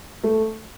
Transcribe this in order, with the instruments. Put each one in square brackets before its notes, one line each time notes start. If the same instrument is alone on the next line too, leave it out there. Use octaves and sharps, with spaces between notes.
[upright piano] A3